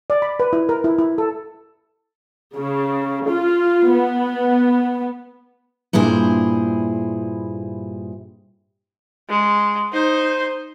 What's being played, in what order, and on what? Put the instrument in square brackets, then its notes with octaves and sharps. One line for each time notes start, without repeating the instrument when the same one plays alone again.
[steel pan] D5
B5
B4
E4
A#4
E4
E4
A4
[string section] C#3
F4
B3
[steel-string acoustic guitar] G2 A#2 E4 G#4 C5
[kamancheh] G#3
D#4 C5